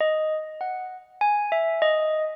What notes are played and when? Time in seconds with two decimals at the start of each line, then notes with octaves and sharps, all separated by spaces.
0.01 D#5
0.61 F#5
1.21 G#5
1.52 E5
1.82 D#5